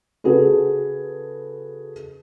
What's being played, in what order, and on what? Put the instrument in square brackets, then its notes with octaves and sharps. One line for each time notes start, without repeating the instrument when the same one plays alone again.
[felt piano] C#3 F#4 G#4 A4 B4